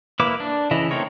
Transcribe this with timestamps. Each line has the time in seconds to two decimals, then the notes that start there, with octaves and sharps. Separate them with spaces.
0.20 A#3 E4 B4 D6
0.40 D4
0.71 C#3 E3 E4 D#5
0.91 A3 C4 D#4 A#4 C#5